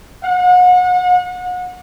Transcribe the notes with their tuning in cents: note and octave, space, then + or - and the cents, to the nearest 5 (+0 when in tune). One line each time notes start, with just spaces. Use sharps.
F#5 -35